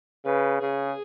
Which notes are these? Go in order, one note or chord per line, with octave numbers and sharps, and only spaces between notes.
C#3 B4
C#3 G#4